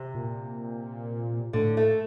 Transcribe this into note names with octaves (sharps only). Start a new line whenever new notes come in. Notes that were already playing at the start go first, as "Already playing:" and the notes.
Already playing: C3
A#2
A2 D3
A3